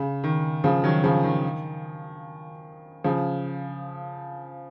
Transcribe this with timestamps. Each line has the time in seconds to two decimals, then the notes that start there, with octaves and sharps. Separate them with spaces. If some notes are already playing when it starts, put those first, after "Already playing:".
Already playing: C#3
0.24 D#3
0.64 C#3 F3
0.83 D#3 F#3
1.03 C#3 F3
1.24 D#3
3.04 C#3 F3